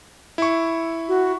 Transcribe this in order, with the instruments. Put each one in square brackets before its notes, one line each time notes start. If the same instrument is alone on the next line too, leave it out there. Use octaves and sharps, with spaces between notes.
[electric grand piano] E4 C#6
[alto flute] F#4